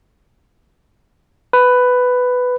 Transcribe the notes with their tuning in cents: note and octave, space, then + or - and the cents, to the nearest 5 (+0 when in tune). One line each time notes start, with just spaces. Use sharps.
B4 +10